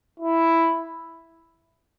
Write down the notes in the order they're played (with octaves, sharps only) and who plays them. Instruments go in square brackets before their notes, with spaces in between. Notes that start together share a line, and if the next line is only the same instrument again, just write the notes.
[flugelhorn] E4